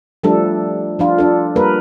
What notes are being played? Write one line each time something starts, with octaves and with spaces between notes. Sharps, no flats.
F3 G3 A3 D4 A4
F3 D4 F4
D4 A4
G3 A#3 A#4 B4